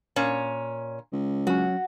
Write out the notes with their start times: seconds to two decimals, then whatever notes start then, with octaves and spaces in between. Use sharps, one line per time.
0.16 A#2 C#4
1.12 C#2
1.47 F#3 C#4 F#4